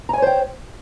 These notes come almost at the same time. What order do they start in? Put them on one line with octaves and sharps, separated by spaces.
A#5 G#5 C#5 C5 G5